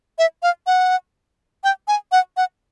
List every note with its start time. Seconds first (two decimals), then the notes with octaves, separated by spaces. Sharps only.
0.18 E5
0.43 F5
0.67 F#5
1.64 G5
1.88 G#5
2.12 F#5
2.37 F#5